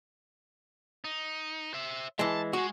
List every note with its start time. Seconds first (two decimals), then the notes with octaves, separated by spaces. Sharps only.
1.04 D#4
1.74 C5 E5
2.19 E3 G#3 A5
2.53 G#3 F#4 G#4